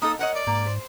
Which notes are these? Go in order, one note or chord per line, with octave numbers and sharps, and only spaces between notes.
A#3 D#4 A4 D#6
A#4 C#5 D#5 F#5
D5
G#2 A#3
C5